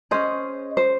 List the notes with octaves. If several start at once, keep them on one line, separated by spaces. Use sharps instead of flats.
C#4 G#4 C5 D#5
C5